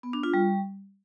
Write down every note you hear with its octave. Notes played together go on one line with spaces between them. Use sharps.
B3
D4
F4
G3